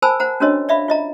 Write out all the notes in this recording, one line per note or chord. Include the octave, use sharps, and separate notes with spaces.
A#4 C5 G#5 A5 B5 E6
C5 F#5 A#5
C#4 D4 F#4 A#4 C#5 D#5
D5 E5 F5 B5
F4 D#5 A#5